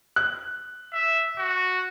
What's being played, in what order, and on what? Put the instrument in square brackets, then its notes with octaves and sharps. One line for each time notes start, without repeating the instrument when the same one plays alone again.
[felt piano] F#6
[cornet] E5
F#4